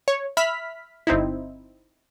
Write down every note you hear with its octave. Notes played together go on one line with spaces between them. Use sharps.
C#5
E5 B5 F6 B6
G1 C4 D#4 E4